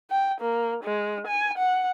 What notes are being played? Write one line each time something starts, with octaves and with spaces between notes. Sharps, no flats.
G5
A#3
G#3
G#5
F#5